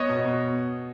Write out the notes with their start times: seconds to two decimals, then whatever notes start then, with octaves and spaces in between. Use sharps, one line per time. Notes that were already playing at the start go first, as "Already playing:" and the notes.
Already playing: B3 C#5 D#5
0.09 B2
0.25 B2